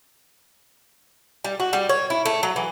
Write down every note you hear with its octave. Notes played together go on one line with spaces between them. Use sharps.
G3
F#4
G3
C#5
E4
A3
F#3
E3